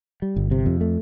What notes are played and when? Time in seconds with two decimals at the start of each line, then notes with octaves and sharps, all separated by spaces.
0.22 G3
0.36 G1
0.51 C3
0.66 F2
0.81 A3